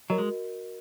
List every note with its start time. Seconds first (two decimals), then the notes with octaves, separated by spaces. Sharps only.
0.10 F#3 F#4 A#4 D#5
0.18 G#3